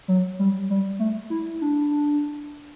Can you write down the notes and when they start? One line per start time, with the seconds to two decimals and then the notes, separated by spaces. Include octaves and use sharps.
0.08 F#3
0.39 G3
0.70 G3
0.99 A3
1.30 E4
1.61 D4